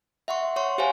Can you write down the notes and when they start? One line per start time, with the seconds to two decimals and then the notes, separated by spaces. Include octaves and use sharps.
0.28 E5 F#5 C6 C#6
0.56 C#5 F#5 C6 C#6
0.78 G4 C5 C#5 F5 F#5 G#5